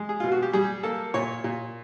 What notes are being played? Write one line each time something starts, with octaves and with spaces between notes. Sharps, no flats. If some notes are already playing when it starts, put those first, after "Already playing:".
Already playing: G#3
G#4
B2 F4
F#4
G4
G3 G#4
A#3 A4
A#2 C#5
A#2